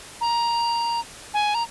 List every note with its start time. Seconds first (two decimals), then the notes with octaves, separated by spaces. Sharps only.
0.21 A#5
1.34 G#5
1.55 A#5